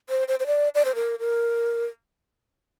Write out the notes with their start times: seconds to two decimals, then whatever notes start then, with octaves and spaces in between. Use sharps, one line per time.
0.09 C5
0.28 C5
0.40 C5
0.47 D5
0.75 D5
0.85 C5
0.95 A#4
1.19 A#4